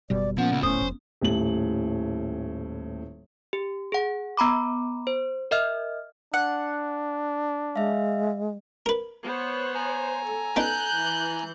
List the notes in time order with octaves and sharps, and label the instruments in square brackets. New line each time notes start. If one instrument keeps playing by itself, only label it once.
[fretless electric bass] F#1 B2 G3 [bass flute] D5
[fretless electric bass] A#2 [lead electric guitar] F3 [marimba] B3 C#4 [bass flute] F#5
[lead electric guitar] C#2
[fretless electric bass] D1 A2 [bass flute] C#4 [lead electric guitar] C5 [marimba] D#6
[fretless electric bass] F1
[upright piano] D#1 A2 F#7
[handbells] G4
G#4 F#5
B3 A#5 B5 D6
C5
A#4 D#5 E5 F6
[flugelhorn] D4 [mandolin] F#5
[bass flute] G#3 [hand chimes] E5 F5
[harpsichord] A#4 B4
[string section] B3 [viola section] C5 C#5
[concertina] G#5 A#5
[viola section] A4
[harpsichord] B3 D4 D#4 [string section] F#6 G6
[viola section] E3